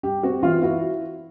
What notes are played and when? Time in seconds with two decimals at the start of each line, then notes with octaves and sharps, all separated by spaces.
0.03 G3 G4
0.23 C4 F#4
0.43 E3 F4
0.62 E4 F#4